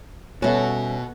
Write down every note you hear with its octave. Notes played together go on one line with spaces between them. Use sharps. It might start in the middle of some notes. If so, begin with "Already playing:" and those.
B2 G3 C#4 F#4 A4 E5